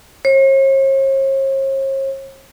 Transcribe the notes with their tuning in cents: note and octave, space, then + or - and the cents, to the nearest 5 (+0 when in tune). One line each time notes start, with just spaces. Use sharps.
C#5 -45